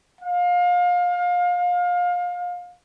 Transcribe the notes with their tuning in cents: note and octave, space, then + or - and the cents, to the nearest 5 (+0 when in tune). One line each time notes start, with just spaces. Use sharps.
F5 +30